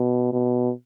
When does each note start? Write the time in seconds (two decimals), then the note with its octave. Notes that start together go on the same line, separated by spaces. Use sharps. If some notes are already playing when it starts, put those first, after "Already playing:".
Already playing: B2
0.32 B2